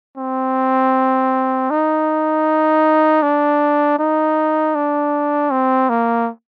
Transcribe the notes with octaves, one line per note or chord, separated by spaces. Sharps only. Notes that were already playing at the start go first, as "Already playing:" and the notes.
C4
D#4
D4
D#4
D4
C4
A#3